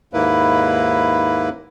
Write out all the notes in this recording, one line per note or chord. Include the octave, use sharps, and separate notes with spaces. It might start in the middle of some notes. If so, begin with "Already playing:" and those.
D#2 G#2 A#3 E4 B4